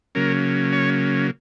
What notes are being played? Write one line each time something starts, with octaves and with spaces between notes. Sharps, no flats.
C#3 F#3 A#3 C#4 A#4
C#5